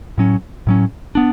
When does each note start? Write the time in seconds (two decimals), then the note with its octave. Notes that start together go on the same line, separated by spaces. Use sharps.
0.18 A2 F#3 C#4
0.67 A2 F#3 C#4
1.15 B3 D4